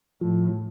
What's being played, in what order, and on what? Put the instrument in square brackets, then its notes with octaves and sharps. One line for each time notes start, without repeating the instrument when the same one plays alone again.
[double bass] A2 [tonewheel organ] F3